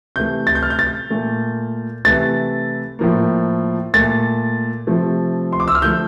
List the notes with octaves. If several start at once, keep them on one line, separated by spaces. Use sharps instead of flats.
C3 E3 A3 G6
A6
G6
F6
G6
A6
A#2 A3
C3 E3 A3 A6
A2 F3 A#3
A#2 A3 A6
C3 F3 A3
C6
D6
E6
F6
D3 F3 A3 G6